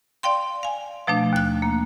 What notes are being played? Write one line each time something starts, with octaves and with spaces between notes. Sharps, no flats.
D5 F5 G5 C6
F5 G#5
B2 F3 A3 D4
D#2 F#6
A#3